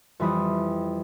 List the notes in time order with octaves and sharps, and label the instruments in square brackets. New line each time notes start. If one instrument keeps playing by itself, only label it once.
[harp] F2 E3 G3 B5 D#6